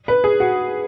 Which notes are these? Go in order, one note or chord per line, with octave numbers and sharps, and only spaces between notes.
B4
G#4
F#4